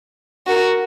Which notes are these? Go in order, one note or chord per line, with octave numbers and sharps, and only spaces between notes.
F#4 A#4